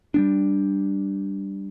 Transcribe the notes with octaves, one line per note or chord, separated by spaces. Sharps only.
G3 B3 D4